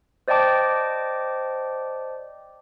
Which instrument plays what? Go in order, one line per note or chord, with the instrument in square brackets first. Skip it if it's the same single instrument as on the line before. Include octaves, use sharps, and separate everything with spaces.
[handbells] C5 D5 D#5 G5 A5 D6